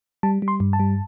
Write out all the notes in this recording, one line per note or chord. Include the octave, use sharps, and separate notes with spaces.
G3 A5
G3
C6
G2
A5
G3